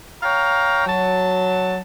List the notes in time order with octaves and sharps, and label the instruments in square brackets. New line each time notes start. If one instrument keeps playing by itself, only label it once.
[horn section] C#5 F5 G5 A#5
F#3 A5